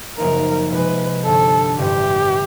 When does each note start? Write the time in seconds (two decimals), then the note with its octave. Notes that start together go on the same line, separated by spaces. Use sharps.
0.18 F#2 C#3 F3 A#3 D#4 A#4
0.72 C3 F3 G#3 B4
1.25 G1 G2 D3 A4
1.79 A1 G2 D3 G4